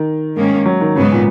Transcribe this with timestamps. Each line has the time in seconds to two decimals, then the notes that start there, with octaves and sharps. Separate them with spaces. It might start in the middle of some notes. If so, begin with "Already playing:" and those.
Already playing: D#3
0.35 G#2 D#3 A#3 C#4
0.66 F#3
0.81 D#3
0.96 G#2 C#3 F#3 B3
1.12 A#2